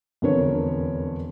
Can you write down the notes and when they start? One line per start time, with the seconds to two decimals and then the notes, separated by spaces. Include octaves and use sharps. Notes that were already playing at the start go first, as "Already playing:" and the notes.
0.22 E1 F2 D3 A#4 B4 C#5